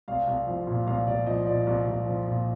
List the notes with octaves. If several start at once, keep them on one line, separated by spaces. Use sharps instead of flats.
C2 F5
C2
F3
A#2
C2 F5
C2 D5
F3 D#5
A#2 D5
C2
C2
F3
A#2